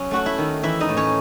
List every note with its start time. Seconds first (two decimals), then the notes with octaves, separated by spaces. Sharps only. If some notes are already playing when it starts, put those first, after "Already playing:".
Already playing: F#3 C#4
0.11 A3 F#4 F#5
0.26 E4 E5
0.38 D#3
0.63 E3 E4 E5
0.80 D#4 D#5
0.89 A2
0.97 C#4 C#5